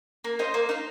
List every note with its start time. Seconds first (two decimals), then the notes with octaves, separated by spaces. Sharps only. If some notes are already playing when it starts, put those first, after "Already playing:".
0.24 A#3
0.39 D#4 C5
0.54 A#3
0.69 D#4 C5